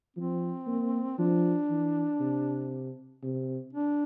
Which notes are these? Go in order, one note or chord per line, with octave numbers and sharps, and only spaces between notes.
F3 C4
A#3
F3 D4
E3
C3
C3
D4